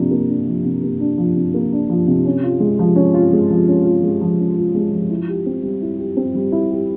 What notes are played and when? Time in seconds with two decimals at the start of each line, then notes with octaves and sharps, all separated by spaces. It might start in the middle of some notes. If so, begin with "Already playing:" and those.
Already playing: C3 F3 A#3 D4
0.11 A#3
0.29 D4
0.47 F3
0.65 C3
0.83 A#3
1.00 D4
1.18 F3
1.36 C3
1.54 A#3
1.72 D4
1.89 F3
2.08 C3
2.25 C#4
2.44 F4
2.60 G#3
2.79 F3
2.96 C#4
3.14 F4
3.33 G#3
3.50 F3
3.68 C#4
3.85 F4
4.03 G#3
4.21 F3
4.39 C#4
4.57 F4
4.75 G#3
4.92 F3
5.10 E4
5.28 G4
5.46 C4
5.63 G3
5.82 E4
5.98 G4
6.17 C4
6.35 G3
6.52 E4
6.71 G4